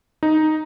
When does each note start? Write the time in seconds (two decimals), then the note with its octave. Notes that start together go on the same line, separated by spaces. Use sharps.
0.23 D#4